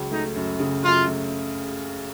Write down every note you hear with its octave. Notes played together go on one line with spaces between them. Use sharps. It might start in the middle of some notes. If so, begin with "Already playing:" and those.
Already playing: C#2 F#3
A3 D#4
F#2
C#3
F#2 F4
A3